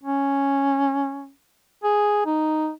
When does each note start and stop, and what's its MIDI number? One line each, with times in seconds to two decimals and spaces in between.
0.03 1.30 61
1.83 2.24 68
2.26 2.70 63